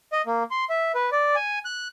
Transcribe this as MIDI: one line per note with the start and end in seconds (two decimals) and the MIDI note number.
0.13 0.22 75
0.26 0.43 58
0.51 0.65 84
0.70 0.92 76
0.95 1.10 71
1.12 1.35 74
1.36 1.59 80
1.65 1.88 90